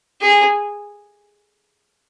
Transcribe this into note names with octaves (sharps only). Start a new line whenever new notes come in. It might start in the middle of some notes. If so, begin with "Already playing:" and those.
G#4